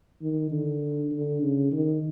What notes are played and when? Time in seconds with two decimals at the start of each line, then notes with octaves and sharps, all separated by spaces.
0.22 D#3
0.52 D3
1.11 D3
1.42 C#3
1.72 D#3